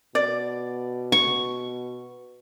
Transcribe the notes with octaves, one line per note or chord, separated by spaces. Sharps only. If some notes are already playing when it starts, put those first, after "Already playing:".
B2 D5
C#6